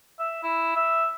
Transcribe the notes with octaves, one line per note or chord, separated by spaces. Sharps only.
E5
E4
E5